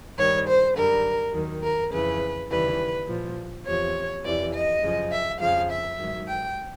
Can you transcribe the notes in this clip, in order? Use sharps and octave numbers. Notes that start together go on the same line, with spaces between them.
G2 D#3 G3 C#5
C5
F#2 D3 G3 A#4
D#2 D#3 F#3
A#4
F2 C#3 E3 B4
D#2 C#3 E3 G3 B4
A#2 F3
E2 C3 F3 C#5
F2 C3 E3 D5
D#5
F#2 C#3 F3
E5
F2 C#3 F3 F5
E5
G#2 D#3 F#3
G5